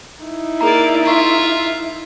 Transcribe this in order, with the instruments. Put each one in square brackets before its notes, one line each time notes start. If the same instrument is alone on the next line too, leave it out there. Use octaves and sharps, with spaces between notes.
[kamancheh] D#4 E4
[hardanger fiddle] A#3 D5 [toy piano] G#4 A#5
[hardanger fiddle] F4 E5 [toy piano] A#5 C#6